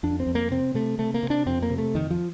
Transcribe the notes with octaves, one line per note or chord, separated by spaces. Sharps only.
F2 D4
C4
F2
A#3
C3 C4
C3 A3
C3 A3
A#3
C3
D4
F2 C4
A#3
C3
A3
F2 D#3
F3